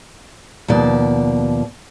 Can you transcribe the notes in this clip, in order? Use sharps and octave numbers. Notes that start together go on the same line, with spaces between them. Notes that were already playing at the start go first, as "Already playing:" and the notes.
D#2 B2 F3 D5